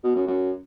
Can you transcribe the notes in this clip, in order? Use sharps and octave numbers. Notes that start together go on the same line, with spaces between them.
B2
F#2
F#2